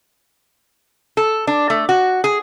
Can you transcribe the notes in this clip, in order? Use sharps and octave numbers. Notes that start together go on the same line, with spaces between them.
A4
D4
A3
F#4
G#4